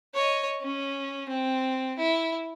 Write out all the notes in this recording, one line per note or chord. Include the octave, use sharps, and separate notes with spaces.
C#5 D#5
C#4
C4
E4